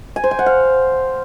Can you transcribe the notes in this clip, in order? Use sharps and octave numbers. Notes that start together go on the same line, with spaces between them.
G#5
C5
G5
F#5
F5